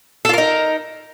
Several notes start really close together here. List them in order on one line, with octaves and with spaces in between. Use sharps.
A4 F4 A#4 D#4